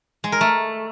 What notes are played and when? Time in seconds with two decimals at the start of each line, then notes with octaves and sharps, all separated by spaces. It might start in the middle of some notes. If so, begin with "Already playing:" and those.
0.24 G#3
0.32 A#4
0.41 A3